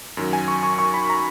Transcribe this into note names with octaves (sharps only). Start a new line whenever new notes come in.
F#2 D#3 F#3
G#5
C#6
C#6
C#6
B5
A#5